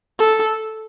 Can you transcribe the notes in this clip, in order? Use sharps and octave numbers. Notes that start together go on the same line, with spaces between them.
A4